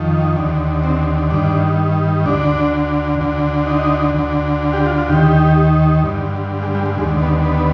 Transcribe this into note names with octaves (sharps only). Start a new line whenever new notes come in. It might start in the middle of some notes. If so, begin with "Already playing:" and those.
Already playing: F2 D#3
D#2 D3
C4
G2 D#3 D4
D2 D3 D4
D2 D3
D#4
D2 D3
G4
F4
F4
D#2 D#3 G4
G2 D3
G#3
G3
G#3
D#2 D3 G#3
B3
B3